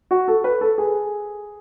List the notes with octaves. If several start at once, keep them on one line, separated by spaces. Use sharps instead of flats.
F#4
A4
B4
A4
G#4